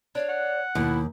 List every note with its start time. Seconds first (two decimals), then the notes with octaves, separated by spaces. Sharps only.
0.15 D4 C#5 F5
0.29 F#5
0.75 D#2 B2 E4